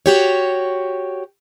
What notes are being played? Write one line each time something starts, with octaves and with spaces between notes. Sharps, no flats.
F#4 G4 C#5